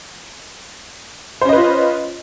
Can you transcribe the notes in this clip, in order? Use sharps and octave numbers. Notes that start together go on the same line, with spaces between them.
C#4 F4 B4 C5 D#5